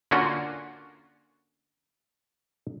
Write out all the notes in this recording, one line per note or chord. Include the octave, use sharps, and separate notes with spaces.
D3 A#3 C#4 F4 F#4